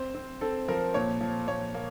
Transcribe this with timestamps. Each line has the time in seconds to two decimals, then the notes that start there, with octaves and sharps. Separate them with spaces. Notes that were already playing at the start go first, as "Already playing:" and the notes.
Already playing: C4 C5
0.15 C4
0.41 C4 A4
0.68 F3 A#4
0.94 A#2 C#5
1.21 F3
1.48 A#2 C#5
1.75 A#3